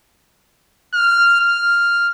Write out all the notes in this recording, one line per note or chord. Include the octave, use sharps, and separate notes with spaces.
F6
F6